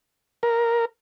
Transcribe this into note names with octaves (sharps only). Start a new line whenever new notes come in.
A#4